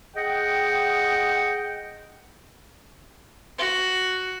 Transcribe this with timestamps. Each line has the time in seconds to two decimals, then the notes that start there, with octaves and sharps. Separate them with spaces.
0.15 G#4 D#5 F#5 G5
3.58 F#4